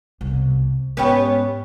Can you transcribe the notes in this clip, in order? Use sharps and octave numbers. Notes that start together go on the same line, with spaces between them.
C2 B2
G#2 B3 C#4 G4